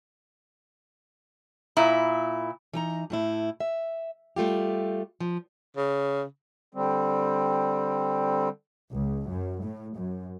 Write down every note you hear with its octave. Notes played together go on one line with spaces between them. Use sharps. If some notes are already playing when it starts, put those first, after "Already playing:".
A#2 E4
E3 D#4 A#5
A2 A3 E4
E5
G3 A3 F4 G4
F3
C#3
D3 G3 C4
C#2
F#2
A2
F#2